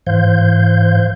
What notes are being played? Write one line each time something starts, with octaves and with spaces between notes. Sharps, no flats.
G#2 E3 C5 F5 G6